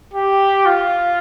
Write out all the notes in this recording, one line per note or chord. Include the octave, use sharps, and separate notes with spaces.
G4
F4